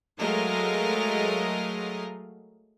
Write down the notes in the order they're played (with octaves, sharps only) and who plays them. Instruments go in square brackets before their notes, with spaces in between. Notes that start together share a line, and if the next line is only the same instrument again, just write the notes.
[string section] F#3 G#3 A3 A#4 D#5 F5